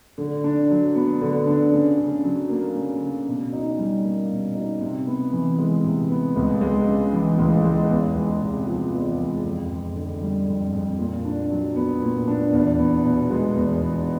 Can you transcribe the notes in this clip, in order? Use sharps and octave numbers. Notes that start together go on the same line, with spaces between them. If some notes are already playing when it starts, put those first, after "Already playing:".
D3
D4
F#3
B3
D3
D4
C#3
C#3
F#3
A#3
C#3
C#3
B2
D#4
G3
A#3
B2
D#4
C3
B3
E3
G#3
C3
B3
C#2
G#3
C#3
E3
C#2
G#3
E2
G#3
C3
F3
E2
G#3
F2
F2
D3
G3
F2
F2
A#2
D4
F#3
B3
A#2
D4
E2
B3
B2
G#3
E2
B3